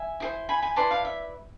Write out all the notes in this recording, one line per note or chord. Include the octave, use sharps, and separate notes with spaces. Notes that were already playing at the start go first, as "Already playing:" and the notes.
Already playing: E5 G#5
E4 G#4 C5
G#5 B5
G#5 B5
E4 B4 D5 A5 C6
F5
E5